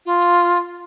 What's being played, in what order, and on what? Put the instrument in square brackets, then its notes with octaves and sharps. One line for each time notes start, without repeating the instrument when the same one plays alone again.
[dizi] F4